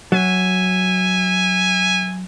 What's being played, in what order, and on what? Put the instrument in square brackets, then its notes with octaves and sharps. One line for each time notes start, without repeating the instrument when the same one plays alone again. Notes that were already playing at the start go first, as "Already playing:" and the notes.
[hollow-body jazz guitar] F#3 [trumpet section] E5 G#5